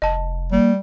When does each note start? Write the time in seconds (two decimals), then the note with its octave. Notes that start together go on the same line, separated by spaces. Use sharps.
0.02 F1 D#5 A5
0.52 G3 A#3